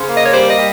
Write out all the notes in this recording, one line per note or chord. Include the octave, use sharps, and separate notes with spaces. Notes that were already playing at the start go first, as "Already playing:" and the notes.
Already playing: C#3 C5
A#3
D#5
C#5
G3 C5
D#5
G3